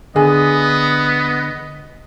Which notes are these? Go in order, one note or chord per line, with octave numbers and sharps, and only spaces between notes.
D3 B3 G#4 D#5 G#5